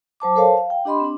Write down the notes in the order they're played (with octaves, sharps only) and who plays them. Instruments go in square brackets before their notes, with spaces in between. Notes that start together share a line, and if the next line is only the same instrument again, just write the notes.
[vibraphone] F#3 C5 A5 D6
A4 A#4 C5 C#5 F5 A5
F5
G5
D4 G4 D#5 B5 C6
C4 D4